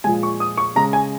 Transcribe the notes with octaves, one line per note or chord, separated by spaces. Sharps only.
A#2 F3 G#3 G#5
C#6
D#6
C#6
C#3 G#3 A#5
G#5